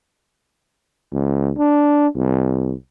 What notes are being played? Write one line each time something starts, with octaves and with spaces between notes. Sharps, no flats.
C#2
D4
C2